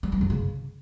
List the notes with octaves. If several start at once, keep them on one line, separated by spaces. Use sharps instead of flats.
G3
B3
F#2
C#3